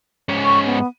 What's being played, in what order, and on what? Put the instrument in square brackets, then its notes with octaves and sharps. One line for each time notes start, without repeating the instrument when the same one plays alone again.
[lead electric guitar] G#2 C#4
[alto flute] C#6
B3